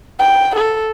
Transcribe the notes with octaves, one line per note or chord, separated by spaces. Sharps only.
G5
A4